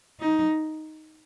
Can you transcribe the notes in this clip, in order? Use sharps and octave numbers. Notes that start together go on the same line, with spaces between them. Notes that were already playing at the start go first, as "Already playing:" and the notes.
D#4